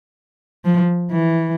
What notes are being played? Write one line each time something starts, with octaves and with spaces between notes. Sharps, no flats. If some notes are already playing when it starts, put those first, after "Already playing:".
F3
E3